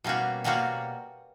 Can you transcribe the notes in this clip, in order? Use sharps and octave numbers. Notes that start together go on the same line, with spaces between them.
B2 G3 A#3 C#4 F#4
B2 G3 A#3 C#4 F#4